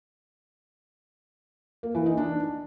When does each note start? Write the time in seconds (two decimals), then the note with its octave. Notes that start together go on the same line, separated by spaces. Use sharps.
1.83 A#3
1.95 E3
2.06 D#4
2.17 D4